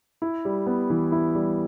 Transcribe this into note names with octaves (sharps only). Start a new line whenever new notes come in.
E4
G3
B3
E3
E4
G3